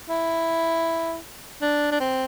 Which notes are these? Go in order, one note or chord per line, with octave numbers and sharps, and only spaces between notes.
E4
D4
D4
C4